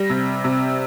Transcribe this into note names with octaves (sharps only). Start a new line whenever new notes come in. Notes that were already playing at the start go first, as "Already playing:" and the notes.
Already playing: G3 A#6
C3
C3